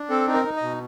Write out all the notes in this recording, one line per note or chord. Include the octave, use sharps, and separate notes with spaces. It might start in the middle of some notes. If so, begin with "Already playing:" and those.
Already playing: D4
C4 A4
D#4
A#4
D#4
D#5
B2